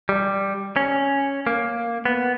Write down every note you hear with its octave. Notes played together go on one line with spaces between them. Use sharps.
G3
C#4
A#3
B3